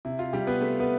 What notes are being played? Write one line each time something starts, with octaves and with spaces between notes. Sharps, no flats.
C3 E4
F4
C3 G3 G4
B3 B4
A3
B3 B4